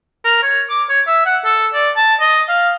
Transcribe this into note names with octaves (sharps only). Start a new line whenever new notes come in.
A#4
C#5
D6
C#5
E5
F#5
A4
D5
A5
D#5
F5